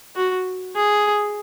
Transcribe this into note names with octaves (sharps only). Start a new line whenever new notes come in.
F#4
G#4